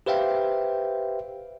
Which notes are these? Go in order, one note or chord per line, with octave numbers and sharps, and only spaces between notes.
G4 B4 C5 E5 F5 G5